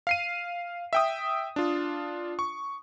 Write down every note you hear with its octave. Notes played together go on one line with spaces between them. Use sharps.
F5 C7 D#7
E5 G5 D#6
D4 F4
C#6